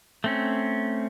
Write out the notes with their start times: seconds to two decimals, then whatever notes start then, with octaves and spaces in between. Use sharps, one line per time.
0.24 A3 C4 C#4